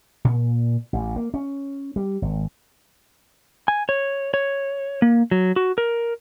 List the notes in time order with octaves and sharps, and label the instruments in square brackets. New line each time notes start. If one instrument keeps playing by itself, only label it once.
[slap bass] A#2
A1
A#3
C#4
G3
G#1
[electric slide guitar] G#5
C#5
C#5
A#3
F#3
F#4
A#4